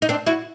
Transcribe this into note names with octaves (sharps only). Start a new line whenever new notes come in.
D#4
C4 D4
E4 F#4